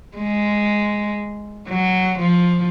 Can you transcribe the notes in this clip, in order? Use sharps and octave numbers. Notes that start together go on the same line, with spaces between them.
G#3
F#3
F3